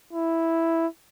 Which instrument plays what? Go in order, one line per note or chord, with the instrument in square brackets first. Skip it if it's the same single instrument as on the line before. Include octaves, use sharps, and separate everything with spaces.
[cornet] E4